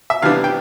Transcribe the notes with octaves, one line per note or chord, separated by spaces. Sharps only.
E5
C3 E3 G3 B3 D4 F5
G5